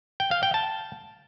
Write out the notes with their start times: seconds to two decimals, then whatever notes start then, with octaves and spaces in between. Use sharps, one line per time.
0.20 G5
0.31 F5
0.43 G5
0.54 A5